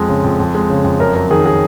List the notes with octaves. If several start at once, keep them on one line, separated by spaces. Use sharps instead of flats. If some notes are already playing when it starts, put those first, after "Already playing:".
Already playing: F2 G#3
C#3
F2
F2
G#3
C#3
F2
F#2 A#4
F#3 A#4
D#3 G#4
G#4